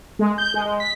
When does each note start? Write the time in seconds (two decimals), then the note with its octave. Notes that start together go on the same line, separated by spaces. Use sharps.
0.19 G#3
0.38 G6
0.54 G#3
0.65 G#3
0.80 B6